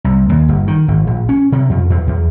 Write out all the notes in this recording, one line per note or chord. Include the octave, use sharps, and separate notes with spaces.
C2
D#2
G1
D#3
G#1
A#1
C#4
C3
F2
E2
E2